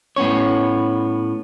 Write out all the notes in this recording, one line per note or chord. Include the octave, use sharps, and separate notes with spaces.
A2 B3 C#4 C#5